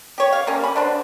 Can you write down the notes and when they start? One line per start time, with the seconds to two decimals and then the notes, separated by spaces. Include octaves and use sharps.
0.18 G4 C#5
0.32 F5
0.47 G3 A#3 C4 C#4
0.64 B5
0.76 D3 D4 C5